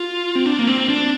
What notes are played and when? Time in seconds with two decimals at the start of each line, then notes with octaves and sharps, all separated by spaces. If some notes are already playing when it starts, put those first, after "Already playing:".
Already playing: F4
0.35 C4
0.46 D4
0.59 A#3
0.67 C4
0.89 D4